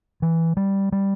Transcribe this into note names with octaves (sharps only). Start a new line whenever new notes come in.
E3
G3
G3